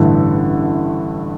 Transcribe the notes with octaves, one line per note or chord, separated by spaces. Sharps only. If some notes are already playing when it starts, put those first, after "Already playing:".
Already playing: A1 G2 D3 A3 E4